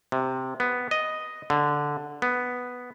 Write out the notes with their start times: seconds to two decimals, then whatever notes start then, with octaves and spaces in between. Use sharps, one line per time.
0.12 C3
0.60 B3
0.91 D#5
1.50 D3
2.22 B3